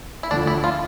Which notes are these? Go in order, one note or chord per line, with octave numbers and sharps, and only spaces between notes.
E4
D2 D3 F3 A3 D4
E4
F4